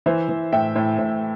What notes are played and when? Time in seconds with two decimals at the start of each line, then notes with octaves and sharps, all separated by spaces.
0.06 E3 C5 E5
0.29 E3
0.52 A2 E5 G5
0.76 A2
0.99 A2